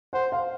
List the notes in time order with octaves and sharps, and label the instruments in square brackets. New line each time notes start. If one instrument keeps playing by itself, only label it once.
[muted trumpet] C5 [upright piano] F#5
[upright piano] F5